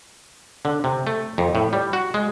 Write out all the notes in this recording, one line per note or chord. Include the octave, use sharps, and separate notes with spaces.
D3
C3
A3
F2
A2
G3
F#4
G#3